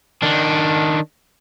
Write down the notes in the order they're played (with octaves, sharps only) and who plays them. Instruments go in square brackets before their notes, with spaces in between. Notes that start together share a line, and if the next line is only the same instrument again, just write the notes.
[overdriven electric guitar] D#3 D4